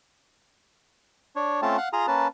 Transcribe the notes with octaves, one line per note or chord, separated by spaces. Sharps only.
D4 C#5
A3 C4 C#4 F4 A5
F5 F#5
F4 G#4 A#5 D#6
A#3 C#4 B4 A5